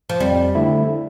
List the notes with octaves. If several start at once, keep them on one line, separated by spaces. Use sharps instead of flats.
F3
F2 G3
D3 A3 E4